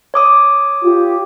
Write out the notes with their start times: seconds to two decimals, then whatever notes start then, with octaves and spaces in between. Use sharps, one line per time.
0.14 C#5 D6 D#6
0.84 F4 G4